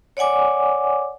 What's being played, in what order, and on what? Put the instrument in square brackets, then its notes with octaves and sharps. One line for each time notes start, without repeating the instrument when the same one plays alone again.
[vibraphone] C#5 D5 F#5 G#5 D6